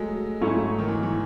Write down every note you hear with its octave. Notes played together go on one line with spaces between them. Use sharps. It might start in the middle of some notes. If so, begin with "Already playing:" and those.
Already playing: F#3 G#3 A3
G#2 F#3 A3 C#4 E4
D#3
E3
E3